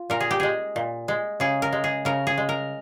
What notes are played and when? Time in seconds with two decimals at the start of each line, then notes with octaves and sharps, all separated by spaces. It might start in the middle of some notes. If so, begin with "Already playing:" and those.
Already playing: F4
0.10 A#2 A#4
0.20 G#4
0.31 G4
0.40 G#3 G#4
0.76 A#2
1.08 G#3
1.40 C#3 G#4
1.62 A#4
1.72 G#3
1.84 G#4
2.05 C#3 A#4
2.27 G#4
2.38 G#3
2.49 A#4